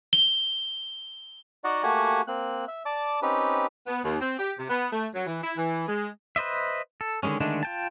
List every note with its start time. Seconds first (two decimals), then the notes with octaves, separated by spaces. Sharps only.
0.13 G7
1.64 D#4 F#4 D5 D#5 F#5
1.83 A3 A#3 F#4 G4 F#5 G#5
2.27 A#3 C4 F#6
2.68 E5
2.86 D5 A5 D6
3.22 C4 C#4 D#4 G4 B4
3.87 B3
4.04 D#2
4.20 C4
4.38 G4
4.57 C3
4.69 B3
4.92 A3
5.13 F#3
5.26 E3
5.42 E4
5.56 E3
5.87 G#3
6.36 B4 C5 D#5 E5
7.01 A4
7.23 D3 D#3 G3 G#3 C#4
7.40 D3 D#3 G#3 A3 D4
7.63 F4 G5 A5